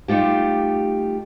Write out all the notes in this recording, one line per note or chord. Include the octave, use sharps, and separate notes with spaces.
G3 A3 D#4 F4 G4